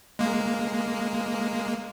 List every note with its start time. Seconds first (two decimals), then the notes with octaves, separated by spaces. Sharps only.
0.19 G#3 A#3